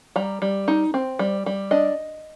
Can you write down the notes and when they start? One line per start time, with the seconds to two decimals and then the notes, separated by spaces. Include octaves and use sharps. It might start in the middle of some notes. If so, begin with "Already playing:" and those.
0.16 G3 A#5
0.42 G3
0.68 D#4
0.94 C4
1.19 G3
1.46 G3
1.71 D4 D#5